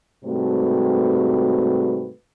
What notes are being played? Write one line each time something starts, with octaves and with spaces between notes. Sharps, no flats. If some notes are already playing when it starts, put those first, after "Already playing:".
G#2 C3 G3 A3 F#4 B4